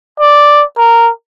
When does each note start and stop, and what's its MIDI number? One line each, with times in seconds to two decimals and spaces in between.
0.20 0.64 74
0.78 1.10 70